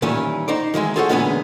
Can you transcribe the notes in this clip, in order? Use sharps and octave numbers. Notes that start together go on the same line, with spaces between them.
A#2 D#3 E3 G3 C#4
D#4 C5 D5
D#3 E3 F#3 G#3
F4 G#4 A4 C5 C#5 F#5
A#2 D3 E3 G#3 B3 C#4